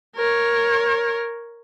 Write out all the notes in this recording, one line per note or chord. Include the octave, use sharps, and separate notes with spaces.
A#4 C#5